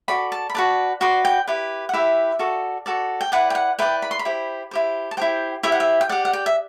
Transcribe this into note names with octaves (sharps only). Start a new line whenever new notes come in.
F#4 A4 D5 B5
A5
B5
F#4 B4 D5 A5
F#4 B4 D5 C6
G5
E4 G4 B4
F#5
E4 G4 B4 E5
F#4 A4 D5
F#4 A4 D5
G5
E4 B4 D5 F#5
G5
F#5
E4 B4 D5 G5
B5
C6
B5
E4 G4 C5
E4 G4 C5
A5
E4 G4 C5 G5
E4 G4 C5 E5
F#5
E5
G5
G4 D5 F#5
F#5
G5
E5